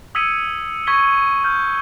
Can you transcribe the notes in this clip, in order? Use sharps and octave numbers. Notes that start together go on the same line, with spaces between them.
D#6 E6 G#6 B6 C#7 D#7
C#6 G#6 B6 G7
F6 G6